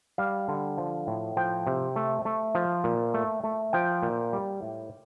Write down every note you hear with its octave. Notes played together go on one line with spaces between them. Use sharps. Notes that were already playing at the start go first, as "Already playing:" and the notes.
G3 F5
D3
F3
A2
F3 G5
C3
A3
A3
F3
A#2
A3
A3
F3 G5
A#2
G3
A2